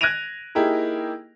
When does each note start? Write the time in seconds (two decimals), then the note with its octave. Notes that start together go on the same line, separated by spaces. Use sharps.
0.01 F#6 G#6 A#6 D7 D#7 F7
0.55 A#3 D#4 E4 G4 G#4 A#4